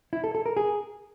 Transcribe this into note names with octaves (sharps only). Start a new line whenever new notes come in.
E4
A4
A4
A#4
G#4